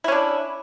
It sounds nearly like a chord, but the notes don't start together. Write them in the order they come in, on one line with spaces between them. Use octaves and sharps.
E4 C#4 D4